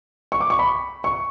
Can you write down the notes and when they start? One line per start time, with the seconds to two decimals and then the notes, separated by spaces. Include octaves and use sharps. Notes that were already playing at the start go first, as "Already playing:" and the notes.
0.32 C#6
0.41 D6
0.50 C#6
0.59 B5
1.04 C#6